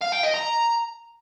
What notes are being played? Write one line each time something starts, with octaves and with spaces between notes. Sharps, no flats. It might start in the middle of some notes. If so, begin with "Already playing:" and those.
F5
G5
D#5
A#5